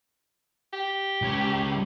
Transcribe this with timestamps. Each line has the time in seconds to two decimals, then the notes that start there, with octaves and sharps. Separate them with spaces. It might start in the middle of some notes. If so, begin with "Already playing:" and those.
0.73 G4
1.22 C#2 C#5